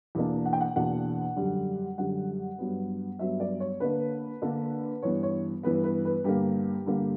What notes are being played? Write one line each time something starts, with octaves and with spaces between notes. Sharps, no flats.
E2 B2 A#3 D4
F#5
G5
F#5
E2 B2 A#3 D4 F#5
F#2 D3 G3
F#2 D3 G3 F#5
G2 F#3 B3
G2 F#3 B3 E5
D5
C#5
D3 A#3 D4 B4
D3 A#3 D4
G2 E3 B3 C#5
C#5
G2 E3 B3 B4
B4
B4
G2 D3 A#3 G4
G2 D3 A#3